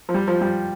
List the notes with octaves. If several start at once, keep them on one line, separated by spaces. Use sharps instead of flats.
F3
G3
F3
G3